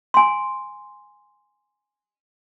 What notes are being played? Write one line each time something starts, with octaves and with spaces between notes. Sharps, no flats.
G#5 C6